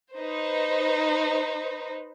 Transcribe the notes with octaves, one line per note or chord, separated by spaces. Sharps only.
D#4 B4 C5